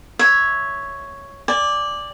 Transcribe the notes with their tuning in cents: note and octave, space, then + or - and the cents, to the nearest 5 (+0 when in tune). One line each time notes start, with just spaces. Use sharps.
C#5 +0 E5 -5
D5 +0 G#5 -40